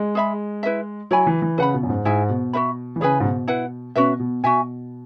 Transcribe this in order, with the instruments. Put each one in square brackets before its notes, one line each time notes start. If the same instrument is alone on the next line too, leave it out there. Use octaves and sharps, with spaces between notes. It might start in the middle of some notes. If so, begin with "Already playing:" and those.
Already playing: [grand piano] G#3
[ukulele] G#4 E5 B5
E4 B4 E5
[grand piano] F#3 [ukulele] E4 C#5 G#5 B5
[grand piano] E3
E3
[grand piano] C#3 [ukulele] B4 F#5 B5
[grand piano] B2
F#2
G#2
[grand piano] G#2 [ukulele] E4 G#4 E5 G#5
[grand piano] B2
[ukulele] F#4 B4 E5 B5
[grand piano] E3
[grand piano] C#3 [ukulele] E4 G#4 B4 G#5
[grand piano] G#2
B2
[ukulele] E4 B4 F#5
[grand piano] B2 [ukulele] C#4 F#4 B4 E5
[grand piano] B2
[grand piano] B2 [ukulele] F#4 E5 G#5